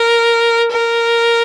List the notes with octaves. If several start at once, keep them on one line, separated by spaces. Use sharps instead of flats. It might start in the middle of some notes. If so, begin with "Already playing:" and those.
Already playing: A#4
A#4